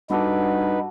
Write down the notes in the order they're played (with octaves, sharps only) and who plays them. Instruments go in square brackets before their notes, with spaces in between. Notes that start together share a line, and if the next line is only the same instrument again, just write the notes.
[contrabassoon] G2 [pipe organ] D#4 B4 [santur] F#4 A4 D6